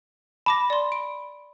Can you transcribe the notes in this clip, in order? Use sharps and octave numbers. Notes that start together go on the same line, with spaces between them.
A5 B5 D6 A#6
D5 C6
D7